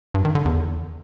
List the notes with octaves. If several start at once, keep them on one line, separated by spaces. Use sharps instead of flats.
G2
D#3
D3
E2